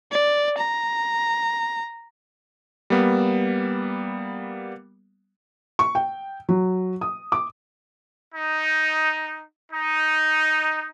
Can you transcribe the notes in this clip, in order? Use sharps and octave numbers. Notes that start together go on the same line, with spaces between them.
D5
A#5
G3 A#3 B3
C#6
G5
F#3
D#6
D6
D#4
D#4